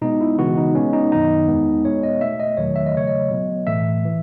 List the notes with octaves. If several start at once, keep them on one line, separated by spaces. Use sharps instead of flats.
B2 G#3 B3 D#4
E4
C#3 E3 G#3 B3 F#4
D#4
B2 G#3 B3 C#4
D#4
F#2 D#3 F#3 B3 D#4
E2 B2 G#3 B3
B2 G#3 B3 C#5
D#5
B2 A3 E5
D#5
E2 D#3 F#3 A3 C#5
E5
D#5
C#3 F#3 A3 C#5
D#5
B2 F#3 B3
A2 E3 A3 E5
E3